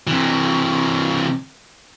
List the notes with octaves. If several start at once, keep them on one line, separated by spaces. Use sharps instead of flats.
C3 E3